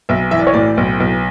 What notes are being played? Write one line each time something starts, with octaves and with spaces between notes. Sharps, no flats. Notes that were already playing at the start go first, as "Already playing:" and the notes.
B1 E5
E3 E5
D5
C#5
A2 D5
B1
B1